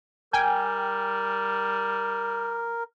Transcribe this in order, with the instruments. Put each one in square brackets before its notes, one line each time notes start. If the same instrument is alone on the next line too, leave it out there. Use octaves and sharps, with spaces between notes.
[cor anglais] G3 [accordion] A#4 [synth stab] G5 G#5